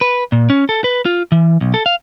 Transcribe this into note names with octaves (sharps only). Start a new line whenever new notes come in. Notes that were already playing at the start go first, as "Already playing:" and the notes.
B4
A#2
C#4
A4
B4
F4
E3
B1
A4
F5